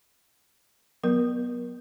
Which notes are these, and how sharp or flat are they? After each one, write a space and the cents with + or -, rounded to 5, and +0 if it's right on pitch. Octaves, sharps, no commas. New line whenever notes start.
F#3 +0 B3 -15 A#4 +35